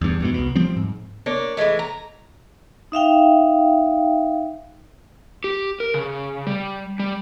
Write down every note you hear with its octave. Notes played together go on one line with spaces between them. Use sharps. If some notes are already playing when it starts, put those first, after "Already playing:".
E2 G2
E2 G#2 B2
C2 B2
F3 G3 C4
G#2
A#3 D4 C#5
E3 F3 G#3 A3
A#5
D#4 E5 F5 G5
G4
A#4
C#3
G3
G3